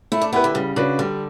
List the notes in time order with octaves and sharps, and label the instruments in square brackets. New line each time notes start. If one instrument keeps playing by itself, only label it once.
[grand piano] A3 [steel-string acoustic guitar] E4
[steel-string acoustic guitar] D4
[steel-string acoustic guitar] B3 [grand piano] E4 G4 B4
[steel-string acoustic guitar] D3
[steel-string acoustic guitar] C#3 [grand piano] G3
[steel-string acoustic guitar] C#3 [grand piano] D4 F#4 B4
[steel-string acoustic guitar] D3 [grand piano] G3